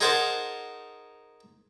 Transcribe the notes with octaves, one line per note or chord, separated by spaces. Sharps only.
D#4 G#4 A#4 C5 F#5 A5